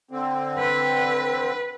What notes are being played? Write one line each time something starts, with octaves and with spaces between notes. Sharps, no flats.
D3 C4
B4